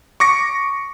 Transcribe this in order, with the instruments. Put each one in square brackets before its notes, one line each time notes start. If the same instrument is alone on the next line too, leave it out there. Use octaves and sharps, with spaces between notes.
[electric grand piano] C#6 D6 A#6 C#7